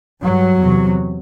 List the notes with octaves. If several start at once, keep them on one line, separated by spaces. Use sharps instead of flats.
G2 F#3
E2 C3